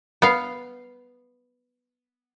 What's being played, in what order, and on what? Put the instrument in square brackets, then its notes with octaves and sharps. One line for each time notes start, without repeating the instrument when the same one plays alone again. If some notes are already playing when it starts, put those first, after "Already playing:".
[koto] B3 F5